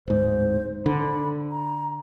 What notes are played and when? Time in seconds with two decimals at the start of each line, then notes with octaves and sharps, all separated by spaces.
0.08 D1 G#2 C5
0.86 D3 B5
1.51 A#5